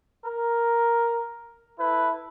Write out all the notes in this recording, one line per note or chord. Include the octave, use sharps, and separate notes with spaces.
A#4
E4 A4 B4